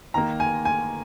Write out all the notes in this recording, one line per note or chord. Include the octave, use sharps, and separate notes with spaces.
D#3 A#3 A#5
G#5
G#5